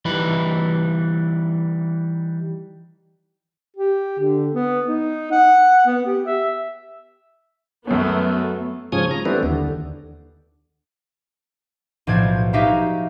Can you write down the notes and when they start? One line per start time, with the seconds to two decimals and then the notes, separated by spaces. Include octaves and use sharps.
0.05 E3 G3 D#4 B4
3.76 G4
4.19 D3
4.53 B3
4.88 D#4
5.31 F#5
5.86 B3
6.06 G4
6.26 E5
7.87 F#2 F#3 A3 B3 C#4
8.92 G#2 C#3 F3 C#5 G#5 D#6
9.11 A#5
9.26 E3 G3 A3 B3 C4 D4
9.43 D#2 D3
12.07 B1 A2 F3 C5 D5 G#6
12.53 D#4 F#4 G4 E5 F5 A#5